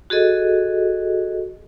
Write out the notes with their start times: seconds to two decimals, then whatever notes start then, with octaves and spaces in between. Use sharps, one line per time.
0.10 F#4 G#4 A4 D#5